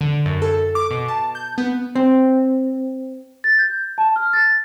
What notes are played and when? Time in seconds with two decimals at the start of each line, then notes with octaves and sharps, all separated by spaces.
0.01 D3
0.26 F#2
0.42 A4
0.75 D6
0.91 B2
1.08 A5
1.35 G6
1.58 B3
1.95 C4
3.44 A6
3.59 G6
3.98 A5
4.16 F6
4.33 A6